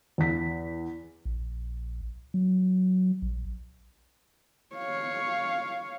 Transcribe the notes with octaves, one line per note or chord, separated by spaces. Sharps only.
E2 B6
A#1
F#3
A#1
C#5 F5